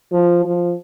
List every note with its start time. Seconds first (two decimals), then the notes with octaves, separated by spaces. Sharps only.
0.12 F3
0.45 F3